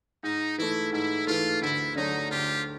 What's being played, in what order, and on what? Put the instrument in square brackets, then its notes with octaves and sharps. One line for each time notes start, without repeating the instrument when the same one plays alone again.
[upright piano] G#2 [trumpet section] D#4
[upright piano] E3 A3 [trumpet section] E4
[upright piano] G#2 [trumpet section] E4
[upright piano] E3 A3 [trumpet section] F4
[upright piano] D2 [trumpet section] E4
[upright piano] D3 F#3 A3 [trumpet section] D#4
[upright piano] D2 [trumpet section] F4 G4